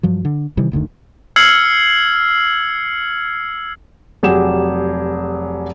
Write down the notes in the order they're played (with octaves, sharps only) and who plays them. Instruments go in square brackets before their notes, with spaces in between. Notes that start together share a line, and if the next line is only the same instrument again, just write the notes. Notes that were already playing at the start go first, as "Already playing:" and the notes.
[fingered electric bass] G2 F3 F#3
D3
C3 D#3 E3 G3
F#1 D2 D3 D#3
[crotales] E6 F6 G#6 C7 C#7 F#7
[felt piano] F1 F#3 G4 G#4 E7